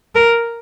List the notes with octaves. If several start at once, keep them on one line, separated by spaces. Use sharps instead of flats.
A#4